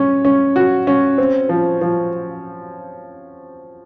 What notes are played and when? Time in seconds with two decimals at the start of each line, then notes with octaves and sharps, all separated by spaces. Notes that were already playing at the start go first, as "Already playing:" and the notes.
Already playing: C#4
0.25 C#4
0.56 F#4
0.87 C#4
1.18 C4
1.49 F3
1.81 F3